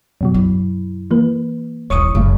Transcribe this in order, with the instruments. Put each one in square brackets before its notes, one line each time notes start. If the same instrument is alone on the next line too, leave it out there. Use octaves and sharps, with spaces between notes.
[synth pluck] F#2 B2 F#3
[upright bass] E4
[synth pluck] E3 A#3 B4
[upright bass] D#1 A1 [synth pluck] C#5 C#6 D#6
[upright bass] F#1 [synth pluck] C2 F#2 A2